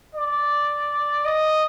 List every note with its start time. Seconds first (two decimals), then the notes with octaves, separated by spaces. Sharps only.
0.15 D5
1.25 D#5